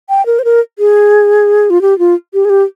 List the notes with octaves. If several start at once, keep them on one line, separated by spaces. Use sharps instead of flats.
G5
A#4
C5
A#4
G#4
F4
G4
F4
G4
G#4
G4